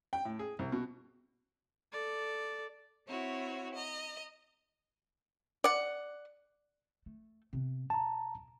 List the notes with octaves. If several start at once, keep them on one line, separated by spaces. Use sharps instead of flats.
G5
A2
G#4
C2
B2
A4 D5
C4 E4 F#4 C#5
D#5 A#5
D5 F#5
A3
C3 B3
B2 A5 A#5